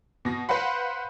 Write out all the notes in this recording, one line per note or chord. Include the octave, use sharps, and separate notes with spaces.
B2 A#6
B4 C5 F5 F#5 B5